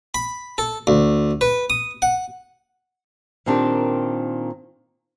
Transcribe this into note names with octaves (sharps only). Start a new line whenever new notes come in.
B5
A4
D2
B4
D#6
F#5
A#2 D#3 C4 D4 G4